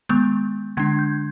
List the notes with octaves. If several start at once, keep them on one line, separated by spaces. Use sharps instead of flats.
D#3 G#3 B3 G6
D3 G#3 D4 G#6
G6